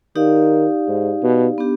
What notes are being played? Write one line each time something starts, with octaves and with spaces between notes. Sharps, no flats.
D#3 D#4 G4 D5 F5
G#2
B2
B3 D4 G4